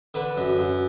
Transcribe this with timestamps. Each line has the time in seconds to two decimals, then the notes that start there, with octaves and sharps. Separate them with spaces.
0.14 D3 B4
0.37 F#2
0.58 F#2